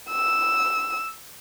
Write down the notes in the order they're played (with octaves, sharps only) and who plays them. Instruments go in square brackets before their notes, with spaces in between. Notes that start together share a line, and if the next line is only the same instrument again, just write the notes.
[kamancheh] E6